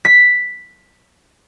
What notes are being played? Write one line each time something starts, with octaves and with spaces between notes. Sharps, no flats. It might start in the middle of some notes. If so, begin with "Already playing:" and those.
B6